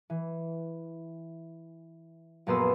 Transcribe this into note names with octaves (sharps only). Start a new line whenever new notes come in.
E3
A#1 F#2 A#3 B3 C6 E6